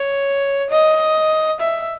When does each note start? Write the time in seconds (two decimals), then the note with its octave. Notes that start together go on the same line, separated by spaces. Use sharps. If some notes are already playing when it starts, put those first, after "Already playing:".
Already playing: C#5
0.70 D#5
1.60 E5